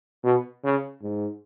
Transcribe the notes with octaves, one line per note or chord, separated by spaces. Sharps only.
B2
C#3
G#2